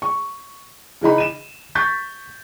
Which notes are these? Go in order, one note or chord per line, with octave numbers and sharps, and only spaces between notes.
C#6
C#3 E3 D#4 B5
D#7 E7
C#6 G6 A6 B6